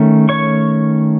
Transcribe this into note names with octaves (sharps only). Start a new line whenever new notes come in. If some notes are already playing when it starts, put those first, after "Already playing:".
Already playing: D#3 A3 C#4
C#5 C#6